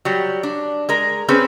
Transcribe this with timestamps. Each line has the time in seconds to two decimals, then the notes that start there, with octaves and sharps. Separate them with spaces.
0.05 F#3 G3
0.43 D4
0.89 G#3 A#4
1.28 C4 C#4 G#4 B4